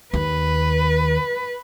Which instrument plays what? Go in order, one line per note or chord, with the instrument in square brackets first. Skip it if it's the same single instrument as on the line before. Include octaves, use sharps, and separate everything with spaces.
[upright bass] D#2 [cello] B4